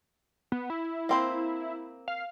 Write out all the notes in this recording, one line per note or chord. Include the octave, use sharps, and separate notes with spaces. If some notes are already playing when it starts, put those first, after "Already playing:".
B3
E4
A#3 C4 C5
F5